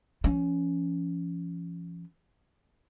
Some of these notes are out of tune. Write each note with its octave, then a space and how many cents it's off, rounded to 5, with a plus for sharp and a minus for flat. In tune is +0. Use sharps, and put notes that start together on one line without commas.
F3 -40 C#4 +15